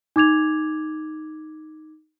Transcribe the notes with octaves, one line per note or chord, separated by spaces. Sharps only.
D#4 D6 G#6 F7